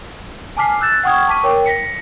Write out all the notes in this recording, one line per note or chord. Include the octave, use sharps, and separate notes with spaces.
G#5 A5 D6 F6 B6 C7
E6 F#6 G6 A6 E7
F#5 G5 C#6 D#6 F6 G#6
A5 C#6 D6 B6 D#7
A#4 C#5 G5
A#6 B6 C#7